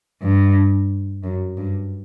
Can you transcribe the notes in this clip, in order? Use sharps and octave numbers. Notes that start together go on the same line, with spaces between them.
G2
F#2
G2